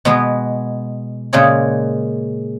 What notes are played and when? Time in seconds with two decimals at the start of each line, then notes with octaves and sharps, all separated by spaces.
0.05 B2 G#3 B3 G#4 B4
1.33 A#2 C#3 G#3 G#4 C#5